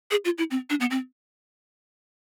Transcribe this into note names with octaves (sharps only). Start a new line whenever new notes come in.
G#4
F4
E4
C4
D4
B3
C4